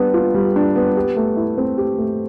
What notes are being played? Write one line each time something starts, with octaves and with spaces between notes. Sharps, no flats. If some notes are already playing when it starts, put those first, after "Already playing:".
Already playing: G3 B3 D4
F4
G3
D4
B3
G4
A3
E4
C4
G4
A3